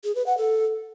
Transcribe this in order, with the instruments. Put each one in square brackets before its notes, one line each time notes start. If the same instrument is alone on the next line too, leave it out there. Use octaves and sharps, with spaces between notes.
[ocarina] G#4
B4
F#5
A4